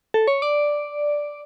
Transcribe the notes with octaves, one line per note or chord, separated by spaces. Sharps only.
A4
C#5
D5